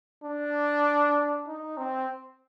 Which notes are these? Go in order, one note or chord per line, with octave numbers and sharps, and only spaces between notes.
D4
D#4
C4